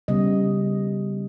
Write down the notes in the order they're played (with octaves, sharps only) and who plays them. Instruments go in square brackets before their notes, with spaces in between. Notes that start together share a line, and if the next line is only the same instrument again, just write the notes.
[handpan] C#3 G3 B3 D#5